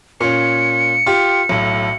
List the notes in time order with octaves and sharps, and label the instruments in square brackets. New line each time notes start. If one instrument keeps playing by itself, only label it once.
[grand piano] A#2 C#4 [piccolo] C#7
[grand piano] F4 G4
B1 A2